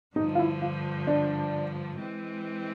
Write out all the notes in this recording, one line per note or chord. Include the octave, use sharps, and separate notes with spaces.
G2 D3 F3 D#4
F4
E4
F4
D4
E3 G#3 C4